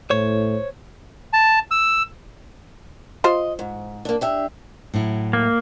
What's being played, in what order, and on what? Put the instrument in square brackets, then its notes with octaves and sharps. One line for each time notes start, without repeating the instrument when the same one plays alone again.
[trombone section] A2 [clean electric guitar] C5 C#5
[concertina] A5
E6
[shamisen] F4 C5 [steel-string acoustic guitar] D#5
[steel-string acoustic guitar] G#2
A#3 D4
D4 G4 E5
[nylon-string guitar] A2 F#3 E4
[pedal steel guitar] A#3